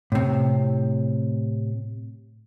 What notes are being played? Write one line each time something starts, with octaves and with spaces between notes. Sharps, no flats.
A2 C3